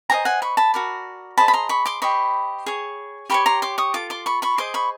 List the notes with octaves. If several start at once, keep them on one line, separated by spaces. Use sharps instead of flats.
G4 C5 D#5 G#5 A#5
F#5 G#5
B5 C#6
A5 B5
F#4 A#4 D5
G#4 C5 D#5 A5 B5
B5
A#5 C6
B5 C#6
C6 D6
G4 C5 D#5 B5 C#6
G#4 C#5
G4 A#4 C#5 B5 C#6
A#5 C6
C6 D6
C#6 D#6
F4 A4 D6
C6 D6
B5 C#6
B5 C#6
G#4 C5 D#5 C6 D6
B5 C#6